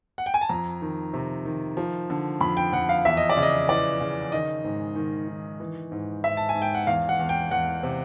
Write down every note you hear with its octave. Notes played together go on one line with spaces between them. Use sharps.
F#5
G5
G#5
A5
F2 A#5
D#3
C3
D#3
F3
D3
F2 B5
G5
F2 F#5
F5
E2 E5
D#5
D5
C#3
D#5
E3 D5
C#3
D#3 D#5
G#2
D#3
D#3
E3
G#2
G#2 E5
A5
G#5
G#2
G5
F#5
E2 F5
F#5
E2
G5
E2 F#5
C3